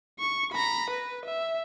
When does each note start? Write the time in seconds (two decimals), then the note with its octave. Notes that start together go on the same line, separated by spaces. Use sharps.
0.20 C#6
0.52 A#5 B5
0.90 B4
1.25 E5